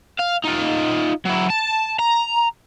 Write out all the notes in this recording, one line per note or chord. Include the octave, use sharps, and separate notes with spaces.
F5
D#4 F4
F#3 E4
A5
A#5